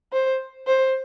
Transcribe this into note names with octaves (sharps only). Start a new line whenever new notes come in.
C5
C5